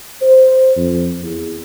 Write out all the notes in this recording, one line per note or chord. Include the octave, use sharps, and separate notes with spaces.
C5
F2
E2